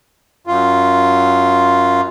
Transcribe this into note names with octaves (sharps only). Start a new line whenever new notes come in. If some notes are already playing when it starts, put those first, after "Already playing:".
F#2 F4